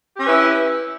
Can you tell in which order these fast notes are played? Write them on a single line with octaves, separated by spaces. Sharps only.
G4 C#4 B4 E4 E5